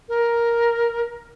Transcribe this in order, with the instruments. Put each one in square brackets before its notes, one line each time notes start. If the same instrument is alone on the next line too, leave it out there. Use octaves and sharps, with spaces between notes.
[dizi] A#4